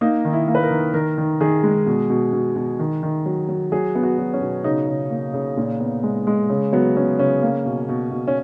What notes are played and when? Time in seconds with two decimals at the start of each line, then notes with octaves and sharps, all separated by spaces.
0.01 A#3 D#4
0.25 D#3
0.33 E4
0.48 A#3
0.55 B4
0.63 A#4
0.71 D#3
0.94 D#3 A#4
1.18 D#3
1.41 D#3 G#4
1.63 G#3
1.86 B2
2.10 B2
2.33 B2
2.56 B2
2.79 D#3
3.03 D#3
3.26 F#3
3.49 F#3
3.72 F#3 G#4
3.95 B3
4.03 F#4
4.18 F#3
4.33 C#4
4.41 B2
4.64 C#3 D#4
4.88 C#3
5.10 A#3
5.34 C#3
5.57 A#2
5.80 B3
6.03 G#3
6.27 G#3
6.50 C#3
6.73 F#3 B3
6.96 B3 C#4
7.19 C#3 C#4
7.42 A#3
7.66 B2
7.89 B2
8.11 B2
8.28 C#4